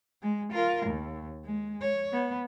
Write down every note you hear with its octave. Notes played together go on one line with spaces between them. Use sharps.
G#3
F4 A#4
D#2
G#3
C#5
B3